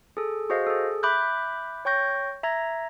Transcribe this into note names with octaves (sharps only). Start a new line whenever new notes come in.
G#4 A4
F#4 G#4 C5 D#5 F5
G#4 A4
E5 B5 D6 F#6 G6
C#5 G5 C#6 G6 A#6
E5 A#5 G#6 A#6